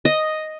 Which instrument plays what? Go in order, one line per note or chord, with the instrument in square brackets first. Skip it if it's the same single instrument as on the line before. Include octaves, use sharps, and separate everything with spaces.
[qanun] D#5